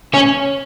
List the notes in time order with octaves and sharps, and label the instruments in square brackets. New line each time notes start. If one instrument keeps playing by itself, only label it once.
[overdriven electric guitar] C#4